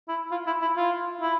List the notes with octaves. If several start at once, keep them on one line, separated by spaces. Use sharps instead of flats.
E4
F4
E4
E4
F4
E4